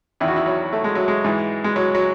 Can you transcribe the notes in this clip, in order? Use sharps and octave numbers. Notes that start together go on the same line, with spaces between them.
E2 D#3 E4
F#4
E4
F#3
A3
G#3
F#3
G#3
G#2 E3
G#3
F#3
F#3